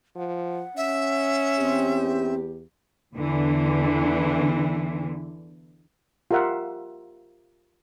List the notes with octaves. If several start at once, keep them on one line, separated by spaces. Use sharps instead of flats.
F3 F#5
C#4 E5
E2 C4 G4
E2 D3 E3
F4 G4 A#4 E5 F#5